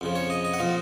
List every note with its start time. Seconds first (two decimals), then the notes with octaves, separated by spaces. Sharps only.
0.01 F2 C#3 F3
0.15 C#5
0.30 D#5
0.45 D#5
0.53 F#5
0.59 A#2 F3 F5